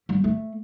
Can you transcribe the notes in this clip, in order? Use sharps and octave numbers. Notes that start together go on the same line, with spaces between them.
G3
A3